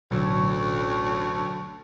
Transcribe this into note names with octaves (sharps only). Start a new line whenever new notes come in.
A1 D2 B2 D3 F#3 A4 C#5